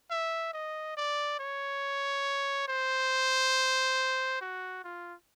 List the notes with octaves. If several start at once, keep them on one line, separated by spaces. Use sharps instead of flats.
E5
D#5
D5
C#5
C5
F#4
F4